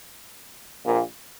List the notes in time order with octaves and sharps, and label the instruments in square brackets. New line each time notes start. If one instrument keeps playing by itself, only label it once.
[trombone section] A#1 A#2